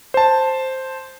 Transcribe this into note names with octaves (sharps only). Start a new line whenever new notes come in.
C5 A5